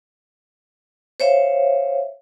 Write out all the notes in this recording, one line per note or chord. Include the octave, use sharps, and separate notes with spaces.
C5 C#5 E5 F5